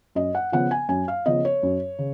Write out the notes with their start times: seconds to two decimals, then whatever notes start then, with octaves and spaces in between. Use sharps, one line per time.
0.15 F#2 D#5
0.35 F#5
0.52 C#3 F3 B3 F#5
0.71 G#5
0.89 F#2 G#5
1.08 F5
1.25 C#3 F3 B3 D#5
1.45 C#5
1.63 F#2
1.99 C#3